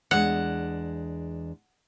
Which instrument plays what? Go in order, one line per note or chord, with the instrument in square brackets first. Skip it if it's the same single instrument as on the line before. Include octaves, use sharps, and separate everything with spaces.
[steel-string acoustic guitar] E2 G#3 D4 [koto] F#5